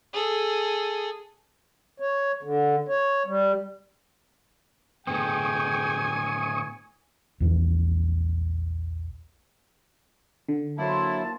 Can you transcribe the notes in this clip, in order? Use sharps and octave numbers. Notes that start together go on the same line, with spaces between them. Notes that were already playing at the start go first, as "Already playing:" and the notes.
G#4 A4
C#5
D3
C#5
G3
A2 D3 B3 G#4 G5 G#5 C#6 D#6
A#1 E2 E3
D3
F#3 A#3 E4 C5 A5